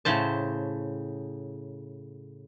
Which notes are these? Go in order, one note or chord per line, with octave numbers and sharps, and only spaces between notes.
A2 C#3 C5 A5